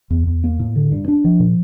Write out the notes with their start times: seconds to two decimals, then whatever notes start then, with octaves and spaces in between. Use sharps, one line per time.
0.10 E2
0.27 E2
0.44 A#3
0.60 A2
0.76 D3
0.92 G2
1.08 D4
1.24 F3
1.40 A#2